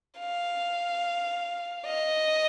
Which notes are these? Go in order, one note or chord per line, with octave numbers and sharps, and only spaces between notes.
F5
D#5